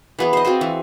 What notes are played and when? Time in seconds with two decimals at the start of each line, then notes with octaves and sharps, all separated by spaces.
0.19 E3 B3 G#4
0.33 C5 D#5
0.45 C4 F4 F#4 C5
0.61 E3